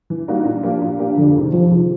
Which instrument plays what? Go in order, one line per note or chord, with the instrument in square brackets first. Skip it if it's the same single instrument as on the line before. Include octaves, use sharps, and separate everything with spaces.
[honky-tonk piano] E3
G3 A#3 D#4 F#4
A#2
F3 A#3 D4 G4
A#2
F3 A#3 D4 G4
[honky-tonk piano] F2 [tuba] D3
[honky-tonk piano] C3 D#3 G#3
[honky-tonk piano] F2 [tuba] F3
[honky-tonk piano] C3 D#3 G#3